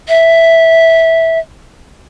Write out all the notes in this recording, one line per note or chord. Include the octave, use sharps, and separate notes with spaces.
E5